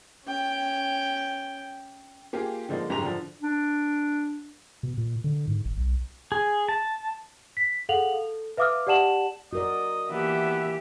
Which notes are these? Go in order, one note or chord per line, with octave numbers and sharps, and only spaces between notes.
C#4 G5
A#3 F4 G4 G#4
D3 F3 G#3 A#3 D#4
F#1 G#2 G4 A#5 F7
D3 F3
D4
B2
A#2
D3
G#2
G#1
B1
G#4
A5
B6
G#4 A4 F5 F#5 F7 F#7
A4
B4 E5 F5 D6 D#6 F6
G4 D5 F#5 A5 E7 F#7
F#4 A#4 D5 D#5
E3 A#3 B3 G4 E5